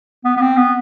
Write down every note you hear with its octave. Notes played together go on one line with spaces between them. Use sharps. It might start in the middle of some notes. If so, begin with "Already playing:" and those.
B3
B3
C4
B3